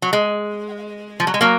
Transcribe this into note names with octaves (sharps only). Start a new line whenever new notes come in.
F#3
G#3
F3
F#3
G#3
F#3 A#3